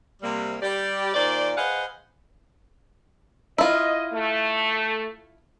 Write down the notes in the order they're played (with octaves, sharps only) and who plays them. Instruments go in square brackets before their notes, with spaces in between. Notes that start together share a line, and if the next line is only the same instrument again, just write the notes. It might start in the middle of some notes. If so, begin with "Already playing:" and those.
[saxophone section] C3 G3 A#3
G3 G4 D5
A#2 D#3 C5 D5
G#4 B4 C5 D#5 F5 F#5
[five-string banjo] E4 F4 [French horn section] D#5
[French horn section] A3